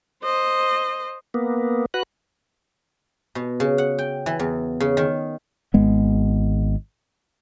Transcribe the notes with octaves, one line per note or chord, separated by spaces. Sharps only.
C5 D#5
A#3 B3
F#4 B4 F#6
B2
C#3
F#5
G5
E3
E2
C#3
D#3
G#1 G#3 B3